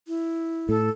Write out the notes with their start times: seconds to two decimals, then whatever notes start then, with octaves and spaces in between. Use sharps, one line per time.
0.08 E4
0.69 A2 A4